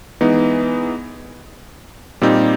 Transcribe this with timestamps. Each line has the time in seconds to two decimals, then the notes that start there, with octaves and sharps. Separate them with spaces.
0.21 E3 G#3 B3 D#4
2.22 A#2 G3 C4 D#4 G4